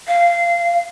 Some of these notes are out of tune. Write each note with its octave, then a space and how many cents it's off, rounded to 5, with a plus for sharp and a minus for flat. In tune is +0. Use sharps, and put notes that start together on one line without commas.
F5 -20